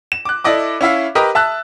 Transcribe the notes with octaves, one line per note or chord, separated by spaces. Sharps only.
E7
D6 F#6
E4 A4 D5 D#5 D6
C#4 E4 E5 F5
G4 A#4 B4 D#5 D#6
E5 A5 E6 F#6